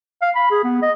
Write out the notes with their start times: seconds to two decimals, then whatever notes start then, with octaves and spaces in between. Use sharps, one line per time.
0.22 F5
0.35 B5
0.51 G#4
0.64 B3
0.82 D#5